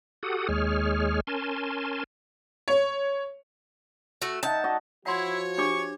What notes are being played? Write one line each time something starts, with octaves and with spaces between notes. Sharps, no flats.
F#4 G4 A4 F#5 D#6
D#2 G#3 G#4 C#5 F6
C#4 A#4 G#5 A5 C6
C#5
A3 F#4
D#4 E5 F#5 A5
F#4 D#5
F3 E4 F#4 C#5 F#5 C6
D4 G4 C#6 D6